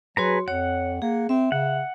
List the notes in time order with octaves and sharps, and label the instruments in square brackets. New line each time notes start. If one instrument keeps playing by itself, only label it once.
[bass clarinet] F#3 [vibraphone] F#4 C#5 C6 [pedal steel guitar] G#4 B4 A#5
[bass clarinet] F2 [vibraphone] C#5 [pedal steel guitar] F#5
[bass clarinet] A#3 [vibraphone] G#4
[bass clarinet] C4 [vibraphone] E5
[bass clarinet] C#3 [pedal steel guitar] F#5